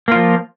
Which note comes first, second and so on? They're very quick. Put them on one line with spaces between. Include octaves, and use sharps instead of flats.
A#3 F4 F3